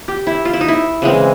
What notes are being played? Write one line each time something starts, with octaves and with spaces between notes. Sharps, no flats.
G4
E4
F4
E4
D#4
E4
C#3 E3 G#3 C4